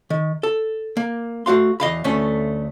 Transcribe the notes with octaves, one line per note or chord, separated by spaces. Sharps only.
D#3
A4
A#3
A3 F#4 F5 C6
E2 D#5 F5 B5
D2 A3 C#4